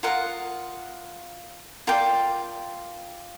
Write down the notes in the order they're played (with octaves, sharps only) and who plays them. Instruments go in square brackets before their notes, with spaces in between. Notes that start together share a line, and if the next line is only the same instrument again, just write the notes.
[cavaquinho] F4 A#4 D#5 F#5
F4 A#4 D5 G5